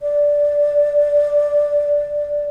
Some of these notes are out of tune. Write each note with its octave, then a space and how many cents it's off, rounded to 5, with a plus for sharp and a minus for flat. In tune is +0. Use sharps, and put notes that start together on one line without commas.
D5 -5